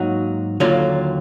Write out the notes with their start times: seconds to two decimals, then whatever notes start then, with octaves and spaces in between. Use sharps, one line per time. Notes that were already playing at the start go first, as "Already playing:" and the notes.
Already playing: G#2 F#3 A#3 D#4 F#4
0.60 D#2 D3 F#3 A#3 F4